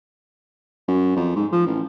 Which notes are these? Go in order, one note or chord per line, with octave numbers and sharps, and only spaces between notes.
F#2
F2
G#2
F3
A1